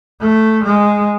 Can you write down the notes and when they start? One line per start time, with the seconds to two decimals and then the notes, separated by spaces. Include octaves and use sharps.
0.21 A3
0.64 G#3